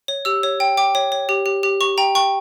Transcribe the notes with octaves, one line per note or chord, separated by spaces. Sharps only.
C#5
G4 E6
C#5
G5
G5 D6
C#5
C#5
G4
G4
G4
G4 C#6
G5 A#5
G5 C#6